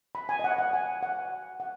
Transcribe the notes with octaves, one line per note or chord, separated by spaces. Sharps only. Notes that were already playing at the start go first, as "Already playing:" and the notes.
B5
G#5
D#5
F#5
F#5
G#5
F#5
F#5